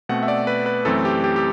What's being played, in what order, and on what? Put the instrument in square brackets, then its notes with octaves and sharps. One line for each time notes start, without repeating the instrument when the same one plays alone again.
[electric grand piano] B2 A3 C4 F#5
E5
D5
B4
B4
F#2 E3 A3 C4 A4
G4
G4
G4